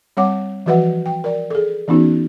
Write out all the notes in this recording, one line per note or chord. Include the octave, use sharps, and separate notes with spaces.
G3 C4 C#5 F#5 D6
E3 F3 F#4 B4 E5 F#5
G5
A#4 D5
G#4 A4
E3 B3 C#4 D#4 F#4